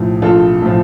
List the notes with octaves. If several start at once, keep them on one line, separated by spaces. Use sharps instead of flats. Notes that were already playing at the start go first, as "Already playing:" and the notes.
Already playing: A#1 A2 F3
A#1 F4 A4
A2 F3